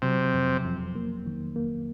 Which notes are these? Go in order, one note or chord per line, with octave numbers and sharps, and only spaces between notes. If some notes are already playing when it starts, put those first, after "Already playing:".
C3 F#3
F2
F2
A#3
D#3
A#3